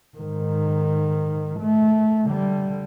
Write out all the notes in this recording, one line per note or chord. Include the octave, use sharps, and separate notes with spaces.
G#2 D#3
A3
D3 G3